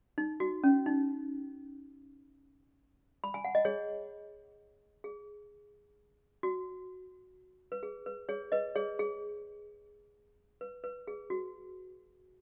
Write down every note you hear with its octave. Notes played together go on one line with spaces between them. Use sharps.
D#4
F#4
C#4
D#4
B5
G#5
F#5
D#5
G#4 C#5
G#4
F#4
B4
G#4
B4
G#4 C#5
B4 D#5
G#4 C#5
G#4
B4
B4
G#4
F#4